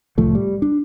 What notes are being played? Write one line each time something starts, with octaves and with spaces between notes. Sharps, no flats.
C2 A2 F3 A3
G3
D4